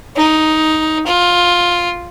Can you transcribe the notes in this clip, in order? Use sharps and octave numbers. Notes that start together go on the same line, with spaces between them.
D#4
F4